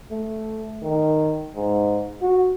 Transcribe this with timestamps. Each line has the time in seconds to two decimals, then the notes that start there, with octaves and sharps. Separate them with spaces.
0.11 A3
0.82 D#3
1.55 G#2
2.21 F#4